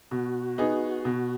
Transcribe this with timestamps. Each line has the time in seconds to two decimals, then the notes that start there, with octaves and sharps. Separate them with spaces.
0.11 B2 F#4
0.58 B3 D#4 G#4
1.05 B2